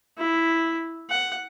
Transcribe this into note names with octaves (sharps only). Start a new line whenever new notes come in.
E4
F#5